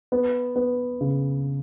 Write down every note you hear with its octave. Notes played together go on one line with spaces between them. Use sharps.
B3
B3
C#3